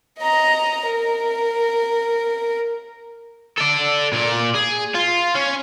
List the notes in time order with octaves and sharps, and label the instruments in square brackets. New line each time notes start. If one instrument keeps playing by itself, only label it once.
[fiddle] D#5 A#5
A#4
[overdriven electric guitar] A4 D5
A#2 D5
G#4
F4
C#4